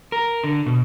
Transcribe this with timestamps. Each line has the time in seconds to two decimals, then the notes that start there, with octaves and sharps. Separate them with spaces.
0.12 A#4
0.44 D3
0.66 B2